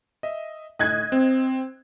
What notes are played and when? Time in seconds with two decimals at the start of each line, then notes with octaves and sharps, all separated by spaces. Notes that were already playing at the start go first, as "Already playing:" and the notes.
0.23 D#5 E5
0.79 A2 D#5 F#6 G#6
1.12 C4